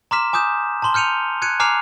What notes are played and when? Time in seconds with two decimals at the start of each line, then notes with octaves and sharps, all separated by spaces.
0.11 A#5 C6 D6 F6 B6 E7
0.33 G#5 D6 D#6 G6 E7
0.82 A5 A#5 C6 G7
0.94 F6 G6 C#7 D#7 F7
1.42 F#6 G#6 C#7 D#7
1.60 G#5 A#5 D6 F6 C7 F7